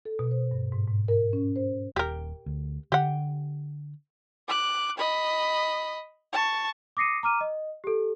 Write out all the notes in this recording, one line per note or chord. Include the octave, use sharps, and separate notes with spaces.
A4
B2
C5
G2
G#2
G#2
A#4
C#4
C5
D#1 G4 A#4
D2
D3 G4 F#5
D6 F#6
D#5 B5
A5 C#6
D6 D#6 A#6 C7 C#7 D#7
A#5 D6 F6 D#7
D#5
G4 A4